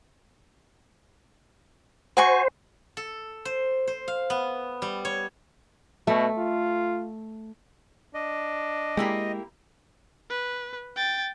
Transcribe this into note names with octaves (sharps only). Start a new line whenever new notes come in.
F#4 C5 G#5 C#6
A4
C5
C5
F5
B3
G3
C#5
B2 A3
F4
D4 D#5
G#3 A#3 E4 G4
B4
G5 A6